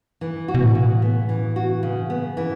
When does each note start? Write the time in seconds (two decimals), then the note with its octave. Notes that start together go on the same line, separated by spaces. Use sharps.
0.21 E3
0.48 F#4
0.55 B2
0.62 A2
0.75 C#3
1.02 B3
1.29 E3
1.56 F#4
1.83 C#3
2.10 B3
2.37 E3